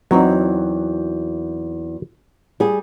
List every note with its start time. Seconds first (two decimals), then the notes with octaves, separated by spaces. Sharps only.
0.11 E2 F#3 C4 D#4
2.60 G3 G#4